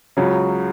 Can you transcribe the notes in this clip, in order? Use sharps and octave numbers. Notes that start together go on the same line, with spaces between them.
C#2 C#3 F#3